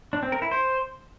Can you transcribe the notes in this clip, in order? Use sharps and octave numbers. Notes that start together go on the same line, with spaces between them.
D4
C4
A#4
E4
C5